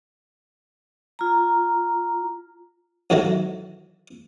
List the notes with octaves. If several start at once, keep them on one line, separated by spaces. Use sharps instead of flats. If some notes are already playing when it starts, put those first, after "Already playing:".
F4 A#5
A1 G#2 D#3 E3 F#3 A3